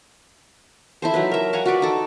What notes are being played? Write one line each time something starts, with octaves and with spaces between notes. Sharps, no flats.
E4 A4 C5
F#3 D#4 B4
A#4 E5
F5 F#5 G#5 A#5
F#4 B4 D5 F#5
D#4 A4